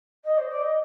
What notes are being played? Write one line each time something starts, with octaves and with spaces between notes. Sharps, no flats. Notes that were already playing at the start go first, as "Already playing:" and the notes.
D#5
C5
D5
D#5